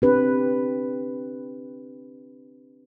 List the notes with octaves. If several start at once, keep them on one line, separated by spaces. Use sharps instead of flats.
C4 D4 G4 B4